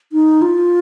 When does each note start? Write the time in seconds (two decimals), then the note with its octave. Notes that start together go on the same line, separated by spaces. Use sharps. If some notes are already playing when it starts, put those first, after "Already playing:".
0.12 D#4
0.42 F4